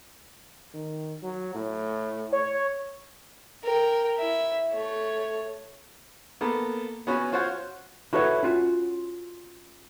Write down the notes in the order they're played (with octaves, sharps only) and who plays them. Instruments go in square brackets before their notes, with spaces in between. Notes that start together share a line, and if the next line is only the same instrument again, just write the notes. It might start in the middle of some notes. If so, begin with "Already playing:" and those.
[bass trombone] D#3
F#3
A2
[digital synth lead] C#5
[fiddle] A#4 G5
E4 E5
A3 C#5
[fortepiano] A#3 B3 A4
B3 C#4 F#4 B4
F4 F#4 C5 C#5 F#5
[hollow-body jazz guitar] E4 F#4 A4 B4 C#5 F#5
C#4 F4 F#4